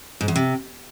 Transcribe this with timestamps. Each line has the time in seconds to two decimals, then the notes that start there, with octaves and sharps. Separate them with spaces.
0.21 G#2
0.28 E2
0.36 C3